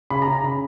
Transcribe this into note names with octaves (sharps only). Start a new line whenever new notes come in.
C#3 B5
A#5
C#3
A#5
C#3 B5